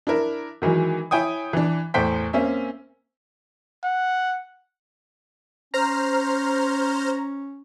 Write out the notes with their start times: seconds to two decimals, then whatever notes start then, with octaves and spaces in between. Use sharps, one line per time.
0.07 D4 E4 A#4
0.62 D#3 E3 F#3 G#3
1.11 E4 C#5 G5 G#5 D#6
1.53 E3 D4
1.94 E2 A2 C5 G5 B6
2.33 A#3 C4 C#4 E5
3.84 F#5
5.74 C#4 C5 A#5 F6